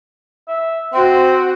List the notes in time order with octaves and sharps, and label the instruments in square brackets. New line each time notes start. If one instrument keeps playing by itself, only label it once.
[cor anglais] E5
[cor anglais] C4 [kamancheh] F#4